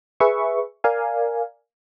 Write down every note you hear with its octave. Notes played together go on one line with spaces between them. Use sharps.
G#4 B4 E5 C#6
A#4 D5 F5 G#5